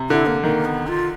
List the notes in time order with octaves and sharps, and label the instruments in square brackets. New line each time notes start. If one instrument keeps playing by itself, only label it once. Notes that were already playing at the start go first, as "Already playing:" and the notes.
Already playing: [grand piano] C3
[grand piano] D3 [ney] E4
[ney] A#3
[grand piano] D#3 [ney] A#3
[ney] B3
F4